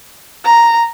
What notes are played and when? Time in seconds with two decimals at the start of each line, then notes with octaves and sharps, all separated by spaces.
0.44 A#5